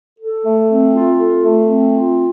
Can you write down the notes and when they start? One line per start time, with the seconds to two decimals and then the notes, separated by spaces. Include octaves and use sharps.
0.19 A4
0.45 A3
0.69 C4
0.94 F4
1.19 A4
1.43 A3
1.68 C4
1.93 F4